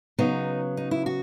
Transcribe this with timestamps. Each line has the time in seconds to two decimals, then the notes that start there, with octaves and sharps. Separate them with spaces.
0.19 C#3 F#3 B3 D#4
0.77 D#4
0.91 E4
1.06 F#4